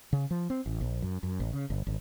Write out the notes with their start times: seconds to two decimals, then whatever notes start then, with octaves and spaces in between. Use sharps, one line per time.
0.13 C#3
0.31 F3
0.50 C4
0.66 A1
0.81 A#1
1.02 F#2
1.23 F#2
1.40 A1
1.53 C#3
1.70 G1
1.87 G#1